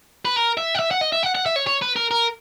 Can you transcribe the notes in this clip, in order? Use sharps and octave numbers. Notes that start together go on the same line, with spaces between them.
B4
A#4
E5
F#5
E5
F#5
D#5
E5
F#5
F#5
E5
C#5
C#5
B4
A#4
A#4